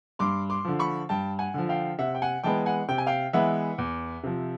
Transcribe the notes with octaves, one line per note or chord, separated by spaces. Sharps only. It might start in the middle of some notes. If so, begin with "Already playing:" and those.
G2 C6 D6
C6 D6
D3 F3
B5 C#6
G2 G5 A5
F#5 G#5
D3 F3
F5 G5
C3 E5 F#5
G5
F#5 G#5
E3 G#3 B3 G5 A5
F#5 G#5
C3 G5
G#5
F5 G5
E3 G#3 B3 E5 F#5
E2
C3 F3